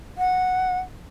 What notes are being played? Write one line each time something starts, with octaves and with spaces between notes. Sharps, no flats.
F#5